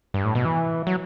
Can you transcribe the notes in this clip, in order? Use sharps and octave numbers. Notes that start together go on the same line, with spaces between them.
G2
A2
B2
E3
F#3